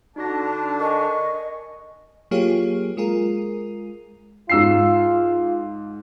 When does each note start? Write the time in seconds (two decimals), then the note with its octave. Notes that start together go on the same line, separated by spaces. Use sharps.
0.16 D3 D4 D#4 F#4 A#6
0.80 A#4 D#5 G#5 C#6
2.31 F#3 A#3 F4 G4 G#4 C#5
2.97 G#3 F4 G#4 A#4
4.50 G#2 F4 E6 C7